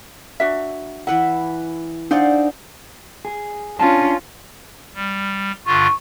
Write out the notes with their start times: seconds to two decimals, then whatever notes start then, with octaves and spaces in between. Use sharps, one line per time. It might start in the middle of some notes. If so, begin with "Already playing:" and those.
0.40 D4 F#4 E5
1.07 E3 B4 E5 F#5
2.11 D4 D#4 C5 D5 F5 F#5
3.25 G#4
3.80 C#4 D4 F4 A5
4.94 G3
5.66 G2 D3 F4 C#6